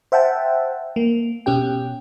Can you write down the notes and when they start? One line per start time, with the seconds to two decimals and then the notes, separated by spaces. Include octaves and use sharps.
0.12 C5 E5 F#5 G5 A5
0.96 A#3
1.46 B2 C#4 G4 G5